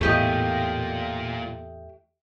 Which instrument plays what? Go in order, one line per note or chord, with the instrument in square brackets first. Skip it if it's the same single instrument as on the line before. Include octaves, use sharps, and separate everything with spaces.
[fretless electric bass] E2 A2 [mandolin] A3 G4 D#5 [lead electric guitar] A#3 F4